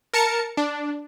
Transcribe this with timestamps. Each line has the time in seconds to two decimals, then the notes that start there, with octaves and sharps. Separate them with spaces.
0.14 A#4 A5 C#7
0.57 D4